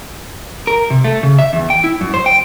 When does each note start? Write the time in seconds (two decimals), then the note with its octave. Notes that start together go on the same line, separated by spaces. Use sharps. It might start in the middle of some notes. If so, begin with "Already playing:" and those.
0.67 A#4
0.90 C3
1.04 A3
1.23 C#3
1.39 E5
1.53 E2
1.70 G5
1.84 E4
2.01 F#2
2.14 C5
2.26 G5